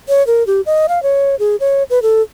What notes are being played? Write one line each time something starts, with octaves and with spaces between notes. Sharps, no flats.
C#5
A#4
G4
D#5
F5
C#5
G#4
C#5
B4
A4